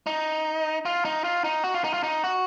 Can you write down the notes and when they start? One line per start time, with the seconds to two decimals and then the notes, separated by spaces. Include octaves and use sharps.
0.07 D#4
0.85 F4
1.05 D#4
1.24 F4
1.44 D#4
1.64 F#4
1.74 F4
1.84 D#4
1.94 F4
2.03 D#4
2.24 F#4